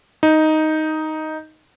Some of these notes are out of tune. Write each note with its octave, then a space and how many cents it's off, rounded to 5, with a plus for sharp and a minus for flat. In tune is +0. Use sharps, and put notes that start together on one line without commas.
D#4 +5